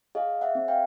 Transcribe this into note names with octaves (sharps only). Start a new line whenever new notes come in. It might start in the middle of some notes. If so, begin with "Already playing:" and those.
G#4 D#5 F5
E5 F#5
C4
F5 G5